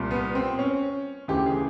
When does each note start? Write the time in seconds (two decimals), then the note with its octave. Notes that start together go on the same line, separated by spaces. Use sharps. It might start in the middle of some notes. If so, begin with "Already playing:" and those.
Already playing: C2 A#2
0.11 B3
0.35 C4
0.59 C#4
1.28 D2 C#3 E3 G4
1.46 G#4